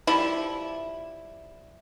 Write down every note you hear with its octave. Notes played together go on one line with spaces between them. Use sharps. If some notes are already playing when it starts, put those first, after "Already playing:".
F3 G3 E4